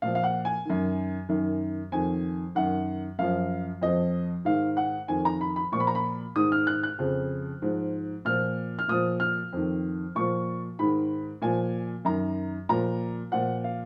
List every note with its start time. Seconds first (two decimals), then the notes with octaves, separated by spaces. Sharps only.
0.02 A#2 F3 F5
0.15 F5
0.24 F#5
0.45 G#5
0.65 F#2 D#3
1.29 F#2 D#3
1.92 F2 D#3 G#5
2.55 F#2 D#3 F#5
3.19 F#2 F3 F5
3.82 F2 F3 D#5
4.45 G#2 D#3 F5
4.77 F#5
5.08 F2 D#3 G#5
5.25 A#5
5.41 B5
5.56 B5
5.72 A#2 F3 C#6
5.80 B5
5.87 A#5
5.95 B5
6.36 G#2 D#3 D#6
6.52 F6
6.67 F#6
6.83 F#6
6.99 F2 C#3 F3
7.62 G#2 F3
8.25 A#2 F3 F6
8.79 F6
8.88 A#2 F3 D#6
9.20 F6
9.53 F2 D#3
10.15 A#2 F3 C#6
10.79 G#2 D#3 B5
11.42 A#2 F3 G#5
12.05 F#2 D#3 A#5
12.69 A#2 F3 A#5
13.31 A#2 F3 F#5
13.64 F5